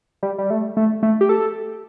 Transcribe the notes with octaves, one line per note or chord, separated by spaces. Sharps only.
G3
G3
A3
A3
A3
G4
A4